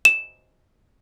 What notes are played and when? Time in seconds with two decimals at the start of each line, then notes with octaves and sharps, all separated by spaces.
0.05 E7